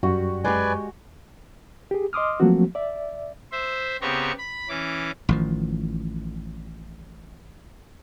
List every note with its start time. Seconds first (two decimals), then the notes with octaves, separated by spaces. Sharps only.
0.03 F#2 G3 F#4
0.44 G#3 G4 B4 D5 G#5
1.91 G4 G#4
2.13 D#5 C6 D6 D#6 F6
2.40 F3 F#3 A3 A#3 C4 F#4
2.75 D5 E5
3.52 C5 E5
4.01 C#3 B3 C4 G4 A#5 C#6
4.38 B5
4.69 E3 C#4 D6
5.29 A1 D#3 F3